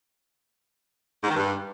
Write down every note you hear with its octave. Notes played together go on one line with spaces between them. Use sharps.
G#2
D#3
G2